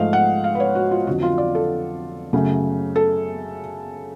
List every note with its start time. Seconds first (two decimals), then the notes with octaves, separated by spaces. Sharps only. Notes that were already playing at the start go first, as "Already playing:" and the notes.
Already playing: G#2 F3 A3 F5
0.13 F#5
0.44 F5
0.55 B4
0.60 C#5
0.75 F#4
0.91 F4
1.07 F2 D3 F#3 F#4
1.23 F4
1.38 D5
1.55 A4
2.33 F#2 C#3 F#3 A3
2.96 A4